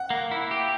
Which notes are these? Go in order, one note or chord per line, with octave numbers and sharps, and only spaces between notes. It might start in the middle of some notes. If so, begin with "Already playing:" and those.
Already playing: F#5
A#3
E4
G4